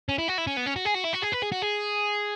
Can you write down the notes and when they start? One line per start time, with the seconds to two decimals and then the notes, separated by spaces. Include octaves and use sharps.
0.09 C#4
0.18 E4
0.28 F#4
0.38 E4
0.47 C#4
0.57 B3
0.66 C#4
0.76 F#4
0.86 G#4
0.95 F#4
1.05 E4
1.14 F#4
1.23 G#4
1.33 B4
1.43 G#4
1.52 F#4
1.62 G#4